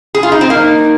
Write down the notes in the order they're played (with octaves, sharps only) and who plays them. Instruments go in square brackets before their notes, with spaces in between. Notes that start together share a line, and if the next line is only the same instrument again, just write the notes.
[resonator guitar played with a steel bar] G#4
F4
D#4
C4
[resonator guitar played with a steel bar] A#3 [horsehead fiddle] D#4